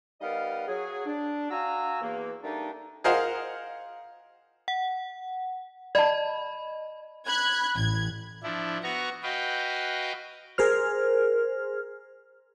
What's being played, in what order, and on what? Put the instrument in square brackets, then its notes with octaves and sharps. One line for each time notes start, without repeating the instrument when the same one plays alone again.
[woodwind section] G3 B3 D#4 A#4 D#5 F5
F#3 G#4
D4
F#4 F5 F#5 G#5 A#5 E6
E2 A#3
G3 A3 A#3 D4 D#4
[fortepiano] G#4 A#4 C5 D#5 F5 F#5
[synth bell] F#5
[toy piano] D5 A5 [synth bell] D#5 B5
[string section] B5 F#6 G#6
A1 G#6
[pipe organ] F3 D4 E4
B3 F#4 A#5 C#6
F#4 B4 D#5 F5 G5
[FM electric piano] G#4 A#4 C5 F6